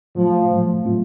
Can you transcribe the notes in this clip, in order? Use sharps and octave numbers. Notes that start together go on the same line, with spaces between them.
A2 F3 F#3 A3
A2 F#3 A3
A2 A3 C4 F4